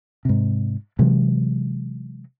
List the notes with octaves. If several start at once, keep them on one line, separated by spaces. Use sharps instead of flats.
G#2 C3
C3 E3 F#3 G#3